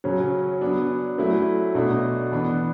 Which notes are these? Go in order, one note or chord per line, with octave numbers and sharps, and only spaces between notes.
C#3 F#3 C#4
F#3 B3 D4
F#3 A3 C#4 E4
B2 A3 D4
E3 B3 D4